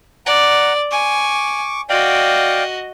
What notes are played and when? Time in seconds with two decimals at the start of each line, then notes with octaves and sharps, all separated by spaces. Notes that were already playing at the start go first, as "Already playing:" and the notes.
0.26 D5 F#5 A#5
0.91 G#5 C#6 D6
1.90 F#4 D5 D#5 F5 G5